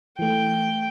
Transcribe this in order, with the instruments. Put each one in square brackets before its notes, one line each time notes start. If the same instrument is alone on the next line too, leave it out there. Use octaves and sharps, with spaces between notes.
[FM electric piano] E3 A3 [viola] G5